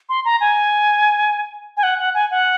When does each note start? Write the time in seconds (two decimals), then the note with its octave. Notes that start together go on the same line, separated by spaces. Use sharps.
0.09 C6
0.25 A#5
0.41 G#5
1.77 G#5
1.83 F#5
1.99 F#5
2.15 G#5
2.31 F#5